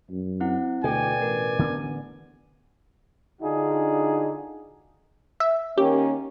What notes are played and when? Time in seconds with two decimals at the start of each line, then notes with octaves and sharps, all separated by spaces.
0.10 F#2
0.40 C4 E4 F#5
0.84 D2 B2 A4 D5 G5 G#5
1.22 A1 A#4
1.59 D3 B3 D4
3.41 D3 D4 D#4 F4 F#4 G#4
5.40 E5
5.78 D#3 A#3 C#4 G4